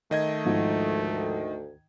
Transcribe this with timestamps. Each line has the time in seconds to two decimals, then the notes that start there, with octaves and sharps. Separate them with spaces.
0.11 D#3 A3 D#5 G#6
0.45 D2 G#2 F3